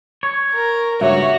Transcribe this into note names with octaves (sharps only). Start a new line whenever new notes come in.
C#5
A#4
C#2 G2 A#3 F#4 C#5 E5